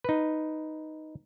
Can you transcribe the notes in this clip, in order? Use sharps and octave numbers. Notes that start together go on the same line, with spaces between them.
D#4 B4